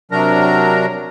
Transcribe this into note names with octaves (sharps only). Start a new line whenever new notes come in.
C3 F#3 D4 A#4 A#5